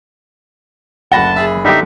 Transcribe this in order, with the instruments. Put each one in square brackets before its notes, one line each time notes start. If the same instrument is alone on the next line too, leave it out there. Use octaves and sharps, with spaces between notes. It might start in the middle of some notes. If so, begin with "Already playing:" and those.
[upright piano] F#1 B5 G7 [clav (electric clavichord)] D2 [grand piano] F#5 A#6 [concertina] A5
[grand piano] G#4 E5
[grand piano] D3 [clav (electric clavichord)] G3 B3 G4 [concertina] D#4 E5